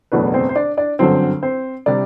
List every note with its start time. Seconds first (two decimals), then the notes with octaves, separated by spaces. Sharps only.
0.12 F#1 E2 B2 A3 D4 B4
0.34 C4 C5
0.49 C5
0.55 D4 D5
0.77 D4 D5
0.99 G1 F#2 D3 F#3 C4 C5
1.43 C4 C5
1.86 C3 G3 D4 D5